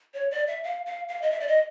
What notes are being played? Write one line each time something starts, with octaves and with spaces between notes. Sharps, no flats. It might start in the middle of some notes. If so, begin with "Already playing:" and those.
C#5
D5
E5
F5
F5
F5
D#5
E5
D5
D#5